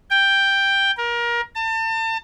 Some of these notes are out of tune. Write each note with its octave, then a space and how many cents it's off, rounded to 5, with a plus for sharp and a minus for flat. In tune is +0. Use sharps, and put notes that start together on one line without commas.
G5 +5
A#4 +25
A5 +35